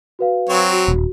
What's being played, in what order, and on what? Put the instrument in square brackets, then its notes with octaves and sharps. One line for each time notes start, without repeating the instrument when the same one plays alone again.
[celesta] F#4 B4 F5
[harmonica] F#3 C4 C#5
[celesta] F#4
[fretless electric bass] D#1